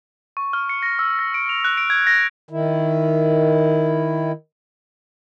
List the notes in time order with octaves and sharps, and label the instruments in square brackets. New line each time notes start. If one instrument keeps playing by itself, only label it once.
[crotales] C#6
F6
C#7
A#6
E6
A#6
D7
F7
F#6
D7
G#6
A#6
[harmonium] D#3 E4